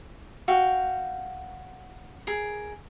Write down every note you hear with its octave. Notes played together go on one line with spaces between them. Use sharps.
F#4 F5 G5
G#4 A#4